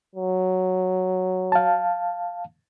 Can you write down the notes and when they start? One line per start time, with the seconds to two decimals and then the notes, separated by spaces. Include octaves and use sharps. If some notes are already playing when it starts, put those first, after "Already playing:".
0.15 F#3
1.52 F5 A5